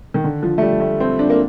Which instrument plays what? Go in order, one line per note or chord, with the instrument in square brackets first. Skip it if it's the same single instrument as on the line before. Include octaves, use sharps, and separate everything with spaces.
[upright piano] D#3
D3
F3
A3
G3
A3
C4
D4
A#3